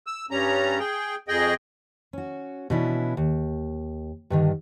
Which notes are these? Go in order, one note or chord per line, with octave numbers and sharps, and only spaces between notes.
E6
G2 G3 C#4 A#5
G#4 G5
F2 G#4 D#5 G5
C#4 F#4
B2 E3 C#4 D4 E4
D#2
G2 D3 D#3